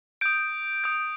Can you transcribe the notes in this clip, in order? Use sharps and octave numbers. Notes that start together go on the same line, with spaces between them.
D#6 G6 D7
D#6 G6